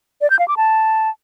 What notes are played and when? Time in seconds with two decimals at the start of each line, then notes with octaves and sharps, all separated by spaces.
0.21 D5
0.30 G6
0.39 F5
0.48 D6
0.57 A5